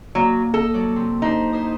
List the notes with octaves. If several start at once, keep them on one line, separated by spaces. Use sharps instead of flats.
F#3 A#3
A4 D#5
F#3 D5
C3
D4 D#4 G4 C5
E4 C5 D#6